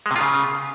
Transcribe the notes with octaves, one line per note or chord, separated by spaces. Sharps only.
G#3
C3
F4
C#3